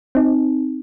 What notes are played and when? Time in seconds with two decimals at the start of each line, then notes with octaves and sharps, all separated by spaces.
0.15 C4 D#4